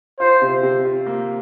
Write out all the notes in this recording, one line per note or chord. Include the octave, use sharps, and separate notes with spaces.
F4 C5
C3
C3
F4
A#3